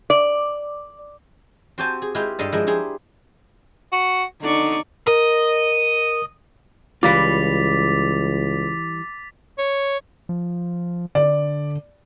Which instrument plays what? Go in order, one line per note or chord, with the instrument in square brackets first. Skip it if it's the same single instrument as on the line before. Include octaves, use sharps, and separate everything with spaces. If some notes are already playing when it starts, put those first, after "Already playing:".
[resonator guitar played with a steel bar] D5
[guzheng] C4 F#4 G4 C5 G#5 A5
G#4
G#3 E4 F4 G4 G#4 B4
G2 D4 A4 D#5 F5 A5
F3 G#3 E4 A#4
E4 G4 G#4 C5
[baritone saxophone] F#4
[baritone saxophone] D3 [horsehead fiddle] D#4 [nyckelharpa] D5 C#6
[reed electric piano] A#4 [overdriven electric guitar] D#5
[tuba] C#2 [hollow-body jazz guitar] E3 G3 F4 [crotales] D6 A6 B6
[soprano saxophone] C#5
[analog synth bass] F3
[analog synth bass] D3 [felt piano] D5